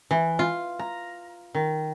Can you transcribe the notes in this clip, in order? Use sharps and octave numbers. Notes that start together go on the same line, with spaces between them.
E3
F4
A#5
D#3